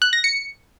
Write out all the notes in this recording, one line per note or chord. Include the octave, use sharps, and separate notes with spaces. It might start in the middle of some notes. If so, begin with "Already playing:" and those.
F#6
A#6
C#7